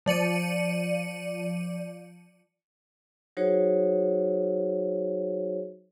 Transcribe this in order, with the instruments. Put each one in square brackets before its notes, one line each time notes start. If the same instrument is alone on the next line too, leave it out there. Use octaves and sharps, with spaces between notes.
[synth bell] F3 D5 C#7 D#7
[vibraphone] F#3 D#4 F#4 G#4 C5 C#5